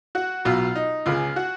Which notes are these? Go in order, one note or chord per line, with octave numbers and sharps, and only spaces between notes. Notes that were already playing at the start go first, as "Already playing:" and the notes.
F#4
B1 B2 F4
D#4
C#2 C#3 F4
F#4